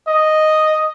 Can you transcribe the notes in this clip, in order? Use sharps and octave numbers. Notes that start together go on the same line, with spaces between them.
D#5